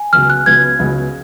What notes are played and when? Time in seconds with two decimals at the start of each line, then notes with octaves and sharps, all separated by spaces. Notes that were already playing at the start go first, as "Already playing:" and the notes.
Already playing: G#5
0.13 C#2 C#3 F#3 B3 F6
0.30 F#6
0.46 C#2 C#3 F#3 B3 G#6
0.79 C#2 C#3 F#3 B3